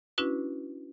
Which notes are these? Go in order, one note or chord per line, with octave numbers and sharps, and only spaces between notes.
C#4 D4 E4 F#4 B4